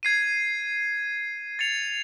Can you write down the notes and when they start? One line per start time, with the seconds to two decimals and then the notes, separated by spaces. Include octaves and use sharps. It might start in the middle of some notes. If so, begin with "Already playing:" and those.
0.03 G#6 C7 D#7
1.59 A6 C#7 F7